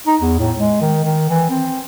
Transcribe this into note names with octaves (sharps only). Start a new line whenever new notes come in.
D#4
E2
A2
G#3
D#3
D#3
E3
C4